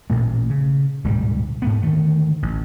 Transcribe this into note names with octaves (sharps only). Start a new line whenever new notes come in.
A1 A#2 A3
C#3
D1 G#2 B2 G3
G#2 A3 B3
D3 D#3 A3
A1